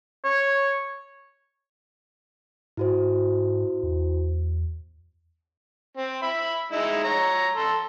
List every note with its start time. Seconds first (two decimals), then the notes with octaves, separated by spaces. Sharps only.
0.25 C#5
2.77 G#2 E4 F#4 C5
3.83 E2
5.97 C4
6.23 E5 B5
6.72 G#3 D#4 E4
7.04 C#5 A#5
7.56 A4 C6